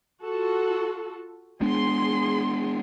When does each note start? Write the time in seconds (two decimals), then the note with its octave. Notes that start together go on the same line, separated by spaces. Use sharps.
0.22 F4 F#4 A4
1.61 G#3 B3 D4 G#4 C6